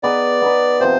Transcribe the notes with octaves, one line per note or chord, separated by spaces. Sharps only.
B3 D#4 G#4 B4 D5
B3 D#4 G#4 B4
C3 F3 C4 C5